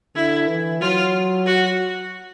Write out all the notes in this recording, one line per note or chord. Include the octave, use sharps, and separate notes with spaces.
D3 E4
E3
F#3 F4
F#4